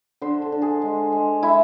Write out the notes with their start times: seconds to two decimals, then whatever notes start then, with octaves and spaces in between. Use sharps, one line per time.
0.22 D3 C5
0.42 A4
0.52 D3
0.62 G#4
0.82 G#3
1.12 G#3
1.42 G#3 E4